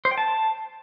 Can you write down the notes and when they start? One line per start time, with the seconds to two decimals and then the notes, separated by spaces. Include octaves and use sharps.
0.05 C5
0.11 G5
0.18 A5